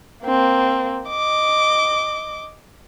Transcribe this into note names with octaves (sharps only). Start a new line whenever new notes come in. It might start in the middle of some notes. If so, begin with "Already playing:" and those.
A#3 C4
D#5 D6